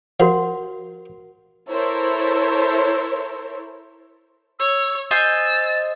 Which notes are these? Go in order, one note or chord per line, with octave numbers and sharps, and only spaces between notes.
F3 F#4 A#4 F#5
E4 A4 A#4 C5 C#5
C#5 E6
C5 D#5 G#5 E6 A6